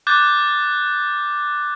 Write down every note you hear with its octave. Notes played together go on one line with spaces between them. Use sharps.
D6 F#6 G6 A6